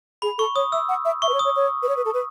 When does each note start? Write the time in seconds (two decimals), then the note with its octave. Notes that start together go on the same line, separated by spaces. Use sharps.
0.22 G#4 B5
0.38 A4 C#6
0.55 C#5 D#6
0.72 E5 E6
0.89 F#5
1.05 E5
1.22 E5 C#6
1.29 B4
1.34 C#5
1.39 D#6
1.45 C#5
1.56 C#5
1.83 B4
1.89 C#5
1.97 B4
2.05 A4
2.14 B4